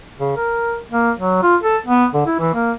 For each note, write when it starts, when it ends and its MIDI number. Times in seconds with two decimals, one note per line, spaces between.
0.20 0.31 49
0.36 0.78 70
0.92 1.11 58
1.18 1.39 54
1.43 1.56 65
1.62 1.77 69
1.86 2.06 59
2.14 2.24 50
2.26 2.39 64
2.39 2.51 52
2.54 2.72 58